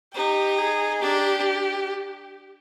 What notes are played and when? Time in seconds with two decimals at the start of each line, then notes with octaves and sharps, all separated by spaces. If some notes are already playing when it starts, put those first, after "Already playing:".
0.14 D#4 G4
0.58 G#4
1.01 D4 G4